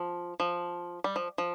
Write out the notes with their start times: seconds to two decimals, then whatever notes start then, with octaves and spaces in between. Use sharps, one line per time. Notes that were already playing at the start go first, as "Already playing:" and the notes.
Already playing: F3
0.40 F3
1.04 G3
1.16 F3
1.38 F3